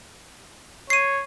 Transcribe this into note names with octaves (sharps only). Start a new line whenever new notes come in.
C#5 C7 D#7